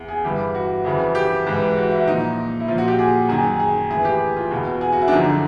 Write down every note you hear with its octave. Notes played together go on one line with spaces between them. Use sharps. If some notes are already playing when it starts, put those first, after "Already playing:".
Already playing: E2
G#4
G2 E3 G4
F#4
F2 C#3 E3
G4
G#2 E3
F#4
E4
A#2 F3 D#4
E4
A#2 F3 F4
F#4
G4
G#4
F#2 D#3 G#4
G#4
A2 E3 G#4
G4
F4
E2 B2 F#4
G#4
F#4
E4
D4
F#2 D3 F3 D#4